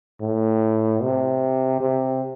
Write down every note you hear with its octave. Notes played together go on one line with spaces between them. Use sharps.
A2
C3
C3